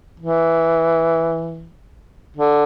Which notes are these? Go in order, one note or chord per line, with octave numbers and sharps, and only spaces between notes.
E3
D3